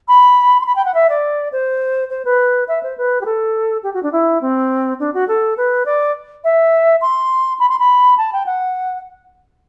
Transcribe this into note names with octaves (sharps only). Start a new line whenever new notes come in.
B5
C6
B5
G5
F#5
E5
D5
C5
C5
B4
E5
C5
B4
G4
A4
G4
F#4
D4
E4
C4
D4
F#4
A4
B4
D5
E5
C6
B5
C6
B5
A5
G5
F#5